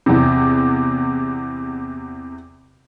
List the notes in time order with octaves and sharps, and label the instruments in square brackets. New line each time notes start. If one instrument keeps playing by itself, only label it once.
[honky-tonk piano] E2 C3